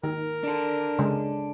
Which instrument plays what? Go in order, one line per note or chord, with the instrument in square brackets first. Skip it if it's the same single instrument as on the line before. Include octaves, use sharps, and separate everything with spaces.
[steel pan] D#3 [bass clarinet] A#4
[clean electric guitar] D4 A4
[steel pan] C#3 G#3